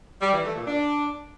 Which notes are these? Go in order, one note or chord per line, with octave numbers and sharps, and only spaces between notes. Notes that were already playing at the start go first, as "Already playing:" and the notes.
G3
E3
A3
A#2
D4